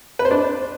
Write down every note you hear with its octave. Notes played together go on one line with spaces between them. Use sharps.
B4
C5
D4